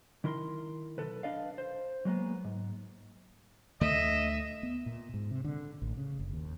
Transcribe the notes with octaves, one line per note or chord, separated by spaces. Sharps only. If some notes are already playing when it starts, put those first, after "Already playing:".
D#3 E4 A#4 C6
B1 A4 B4
D4 B4 D5 D#5 F5
C5
F#3 G#3 A#3 B3
G#2
D2 D3 A3 D#5 E5
B3
A#2
G#2
C3
D3
A1
C#3
F#1
D#2